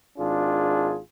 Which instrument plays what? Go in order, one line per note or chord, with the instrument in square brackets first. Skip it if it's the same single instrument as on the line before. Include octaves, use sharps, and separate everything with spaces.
[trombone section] G#1 D4 F4 G#4